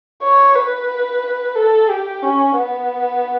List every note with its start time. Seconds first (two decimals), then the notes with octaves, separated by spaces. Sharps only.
0.23 C#5
0.56 B4
1.56 A4
1.90 G4
2.23 C#4
2.57 B3